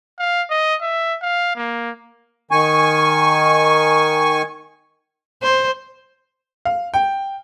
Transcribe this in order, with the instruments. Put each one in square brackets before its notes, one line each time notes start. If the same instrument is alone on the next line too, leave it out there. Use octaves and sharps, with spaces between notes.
[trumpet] F5
D#5
E5
F5
A#3
[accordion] D#3 G#5 C#6
[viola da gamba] C5
[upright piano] F5
G5